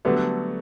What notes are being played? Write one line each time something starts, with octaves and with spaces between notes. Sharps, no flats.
D3 F#3 G3 A3 B3